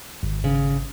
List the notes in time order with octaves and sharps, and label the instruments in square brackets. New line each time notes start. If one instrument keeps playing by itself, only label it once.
[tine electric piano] G#1
[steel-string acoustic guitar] C#3